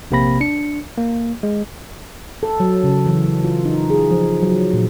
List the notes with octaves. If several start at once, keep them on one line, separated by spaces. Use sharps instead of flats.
A#1 C3 A#3 C4 B5 A#6
D4 C#7
A#3
G#3
A4
F#3
C#3
E3
F4
D#4
G#4
F3
F#3
A#2